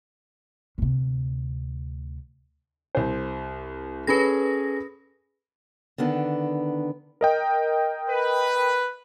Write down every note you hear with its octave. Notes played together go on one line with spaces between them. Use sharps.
D2 C3
C2 C5
C#4 G#4 A4 B4 B5 A#6
D3 D#3 B3 D4
A#4 D#5 G5
B4